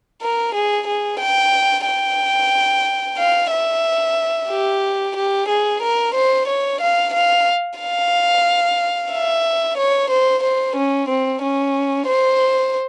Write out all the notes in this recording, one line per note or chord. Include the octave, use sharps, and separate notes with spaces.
A#4
G#4
G#4
G5
G5
F5
E5
G4
G4
G#4
A#4
C5
C#5
F5
F5
F5
E5
C#5
C5
C5
C#4
C4
C#4
C5